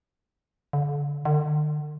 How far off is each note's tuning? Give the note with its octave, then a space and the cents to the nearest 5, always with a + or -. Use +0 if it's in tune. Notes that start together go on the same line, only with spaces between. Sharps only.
D3 -30
D3 +40